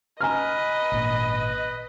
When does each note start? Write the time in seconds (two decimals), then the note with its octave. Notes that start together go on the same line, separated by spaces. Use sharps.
0.21 B4 D#5 G#5 A#5 F6
0.92 G#1 A#2